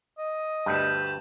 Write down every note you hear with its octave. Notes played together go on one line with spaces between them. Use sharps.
D#5
D2 G2 B4 A5 G6